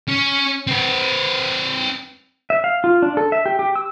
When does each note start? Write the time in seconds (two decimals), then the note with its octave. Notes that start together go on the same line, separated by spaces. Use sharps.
0.08 C#4
0.67 C4 B4
2.50 E5
2.64 F5
2.84 F4
3.02 D4
3.17 A4
3.32 E5
3.46 G4
3.59 G4
3.76 E6